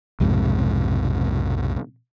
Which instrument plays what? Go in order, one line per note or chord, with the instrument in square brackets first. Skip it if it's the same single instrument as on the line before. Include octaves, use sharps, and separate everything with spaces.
[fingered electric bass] B1 F2 G#2 C3